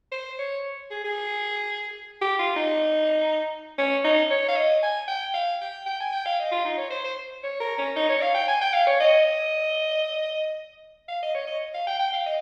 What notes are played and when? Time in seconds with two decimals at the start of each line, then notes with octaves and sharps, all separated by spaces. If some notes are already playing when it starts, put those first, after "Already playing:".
0.12 C5
0.39 C#5
0.91 G#4
1.04 G#4
2.21 G4
2.39 F4
2.56 D#4
3.78 C#4
4.04 D#4
4.30 C#5
4.48 F5
4.56 D#5
4.83 G#5
5.08 G5
5.34 F5
5.61 G5
5.86 G5
6.00 G#5
6.12 G5
6.25 F5
6.39 D#5
6.51 F4
6.65 D#4
6.77 C#5
6.90 C5
7.04 C5
7.43 C#5
7.60 A#4
7.78 C#4
7.96 D#4
8.09 C#5
8.21 F5
8.34 G5
8.48 G#5
8.61 G5
8.73 F5
8.86 C#5
9.00 D#5
11.08 F5
11.22 D#5
11.34 C#5
11.47 D#5
11.74 F5
11.87 G5
11.99 G5
12.12 F5
12.26 D#5